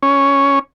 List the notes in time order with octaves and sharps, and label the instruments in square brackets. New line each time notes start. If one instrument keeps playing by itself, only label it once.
[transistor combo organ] C#4